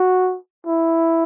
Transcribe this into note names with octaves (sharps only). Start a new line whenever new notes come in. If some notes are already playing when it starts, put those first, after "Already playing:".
Already playing: F#4
E4